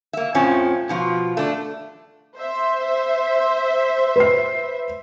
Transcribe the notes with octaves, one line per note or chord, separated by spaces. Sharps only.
A#3 E5
F2 A2 F3 C#4
B2 F3 F4
A3 D4
C5 E5
B4 C7